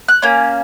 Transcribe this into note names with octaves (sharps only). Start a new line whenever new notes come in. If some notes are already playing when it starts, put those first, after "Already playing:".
F#6
A#3 C#4